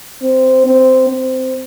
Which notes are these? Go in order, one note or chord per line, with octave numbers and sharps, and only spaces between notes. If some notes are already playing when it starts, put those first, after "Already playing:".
C4
C4
C4